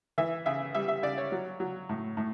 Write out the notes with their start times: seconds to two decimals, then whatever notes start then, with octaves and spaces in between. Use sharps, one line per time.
0.18 E3 E5
0.46 C#3 E5
0.75 G3 E5
0.88 E5
1.03 C#3 D5
1.18 C#5
1.32 F#3
1.60 F#3
1.89 A2
2.17 A2